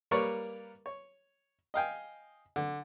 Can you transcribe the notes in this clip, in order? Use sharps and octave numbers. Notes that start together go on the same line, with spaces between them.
G3 A#3 A#4 B4 C#5 D5
C#5
D#5 F5 G5 G#5
D3